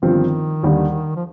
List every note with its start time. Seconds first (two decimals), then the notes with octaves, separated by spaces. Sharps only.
0.02 G1 G2 D#3 F3 C4 F4
0.63 D#2 D3 G3
1.16 F3